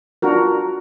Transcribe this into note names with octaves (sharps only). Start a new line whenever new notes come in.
D4 F4 F#4 A#4